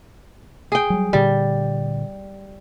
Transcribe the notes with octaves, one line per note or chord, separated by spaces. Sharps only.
G#4 G5
F#3 G3
A#2 D3 G3